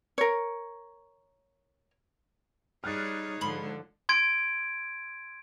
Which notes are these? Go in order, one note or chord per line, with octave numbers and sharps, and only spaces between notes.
A#4 C#5
G3 D#4 G#4 C#5 F6 F#6 A6
G#2 D3 F3 B5 C6
C6 G#6 D7